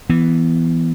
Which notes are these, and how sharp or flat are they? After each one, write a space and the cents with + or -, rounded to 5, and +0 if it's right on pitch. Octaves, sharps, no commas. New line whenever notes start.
E3 +5 B3 +5